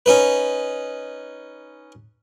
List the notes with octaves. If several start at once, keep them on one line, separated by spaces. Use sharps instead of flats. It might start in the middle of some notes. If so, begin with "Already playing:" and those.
C#4 D#4 B4